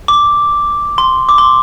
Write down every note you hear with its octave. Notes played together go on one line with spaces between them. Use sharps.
D6
C6
D6
C6